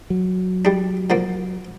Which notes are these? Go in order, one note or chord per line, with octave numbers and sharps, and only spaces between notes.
F#3
G3 D4
D3 F3 A#3